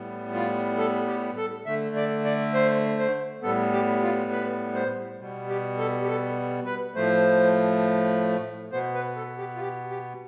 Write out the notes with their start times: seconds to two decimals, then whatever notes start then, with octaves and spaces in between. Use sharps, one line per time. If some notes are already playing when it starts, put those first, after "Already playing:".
Already playing: A2 G3 B3
0.33 F4
0.78 A4
1.07 G4
1.37 A4
1.66 D3 A3 E5
1.96 D5
2.25 D5
2.54 C5
2.99 C5
3.42 A2 G3 B3 A4
3.72 G4
4.02 F4
4.31 B4
4.75 C5
5.19 B2 G3 B3
5.49 G4
5.78 A4
6.02 G4
6.07 A4
6.66 B4
6.95 A2 F3 A3 C5
8.72 B2 B3 C5
8.94 B4
9.16 A4
9.38 G4
9.56 F4
9.60 G4
9.90 G4